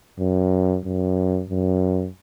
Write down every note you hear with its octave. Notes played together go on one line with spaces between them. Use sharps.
F#2
F#2
F#2